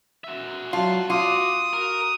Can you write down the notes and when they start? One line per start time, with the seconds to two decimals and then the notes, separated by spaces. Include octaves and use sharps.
0.24 F#4 E5
0.73 F#3 F4 A5
1.10 F4 D6 D#6
1.73 F#4 A#4